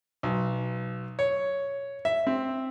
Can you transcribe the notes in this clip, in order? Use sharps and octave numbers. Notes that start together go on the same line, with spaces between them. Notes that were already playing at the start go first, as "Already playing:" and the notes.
B1
C#5
E5
C4